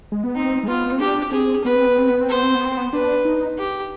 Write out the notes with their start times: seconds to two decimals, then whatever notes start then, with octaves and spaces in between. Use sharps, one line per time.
0.12 G#3
0.24 B3
0.35 C4 D#4
0.63 G#3
0.68 B3 F4
0.92 C4
1.00 D4 G4
1.32 C4 G#4
1.65 B3 B4
1.76 C4
1.87 B3
1.98 C4
2.10 B3
2.21 C4
2.29 B3 C5
2.43 C4
2.55 B3
2.66 C4
2.77 B3
2.93 D4 B4
3.25 D#4
3.58 G4